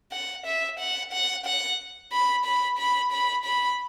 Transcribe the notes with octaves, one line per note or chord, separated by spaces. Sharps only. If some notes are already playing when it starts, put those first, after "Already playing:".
F#5
E5
F#5
F#5
F#5
B5
B5
B5
B5
B5